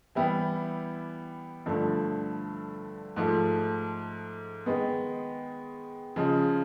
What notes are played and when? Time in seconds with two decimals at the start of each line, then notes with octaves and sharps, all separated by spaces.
0.15 E3 G3 B3 E4 G4
1.66 G2 D3 F3 A3
3.16 G#2 F3 A3
4.66 D#3 G#3 B3
6.16 C#3 F3 G#3